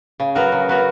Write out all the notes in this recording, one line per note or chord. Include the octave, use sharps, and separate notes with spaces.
C#3
F#3 B3 F#4 A#4
C#3
F#3 B3 F#4 A#4